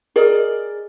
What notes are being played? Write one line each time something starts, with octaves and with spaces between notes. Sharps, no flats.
G#4 A#4 D5 D#5